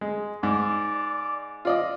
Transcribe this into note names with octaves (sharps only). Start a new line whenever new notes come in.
G#3
G#2 D5
F4 D5 D#5